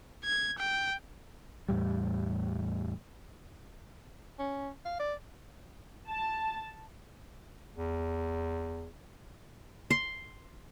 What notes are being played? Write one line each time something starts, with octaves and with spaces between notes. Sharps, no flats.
G#6
G5
E2 A2 G3
C#4
F5
D5
A5
E2
C6